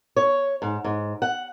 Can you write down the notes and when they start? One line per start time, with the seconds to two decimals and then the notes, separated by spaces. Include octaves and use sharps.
0.16 C#5
0.62 G#2
0.84 G#2
1.22 F#5